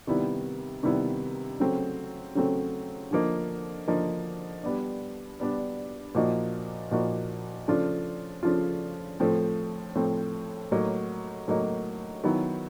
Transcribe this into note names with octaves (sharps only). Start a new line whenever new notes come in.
C3 D#3 G3 B3 E4
C3 D#3 G3 B3 E4
C#3 F#3 A3 C4
C#3 F#3 A3 C4
D3 F3 A#3 D#4
D3 F3 A#3 D#4
G3 B3 D4
G3 B3 D4
A#2 F3 A#3 D#4 F#4
A#2 F3 A#3 D#4 F#4
C#3 F3 A3 D4 F4
C#3 F3 A3 D4 F4
A2 F3 A3 C4
A2 F3 A3 C4
A2 F#3 A#3 D#4
A2 F#3 A#3 D#4
D#3 F#3 B3 E4